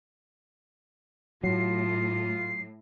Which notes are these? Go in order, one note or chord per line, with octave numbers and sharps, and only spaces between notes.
A2 F#3 F4 C7